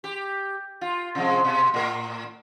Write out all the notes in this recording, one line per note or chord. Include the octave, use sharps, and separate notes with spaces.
G4
F4
C3 F3 G#3
B2
A2 A#4